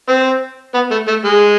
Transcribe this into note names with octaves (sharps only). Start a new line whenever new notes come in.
C4
B3
A3
A3
G#3